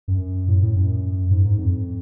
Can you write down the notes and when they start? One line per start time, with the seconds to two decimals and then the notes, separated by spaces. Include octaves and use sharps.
0.08 F#2
0.48 A2
0.62 A2
0.76 F#2
1.31 G#2
1.45 G#2
1.58 F2